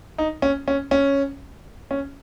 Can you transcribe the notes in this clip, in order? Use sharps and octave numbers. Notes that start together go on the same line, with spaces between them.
D#4
C#4
C#4
C#4
C#4